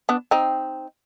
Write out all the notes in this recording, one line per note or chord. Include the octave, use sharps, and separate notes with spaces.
B3 D4
C4 D#4